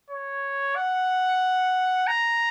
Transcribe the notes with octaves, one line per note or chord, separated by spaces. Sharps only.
C#5
F#5
A#5